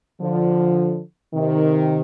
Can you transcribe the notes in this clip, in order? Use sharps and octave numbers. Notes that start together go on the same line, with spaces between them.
D3 F3
C3 D#3